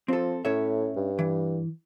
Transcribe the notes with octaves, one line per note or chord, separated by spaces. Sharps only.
F3 C4 A4
A2 C#4 C#5 E5
G2
E3